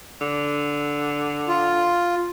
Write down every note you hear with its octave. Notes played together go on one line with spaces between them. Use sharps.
D3
F4